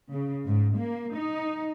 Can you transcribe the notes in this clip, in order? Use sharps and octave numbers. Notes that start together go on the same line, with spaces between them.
C#3
G#2
A#3
D#4